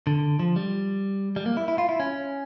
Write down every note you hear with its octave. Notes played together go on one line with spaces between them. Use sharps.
D3
F3
G3
G3
A#3
E4
E4
F4
E4
C#4